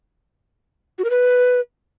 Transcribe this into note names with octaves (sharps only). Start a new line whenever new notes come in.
F#4
A#4
B4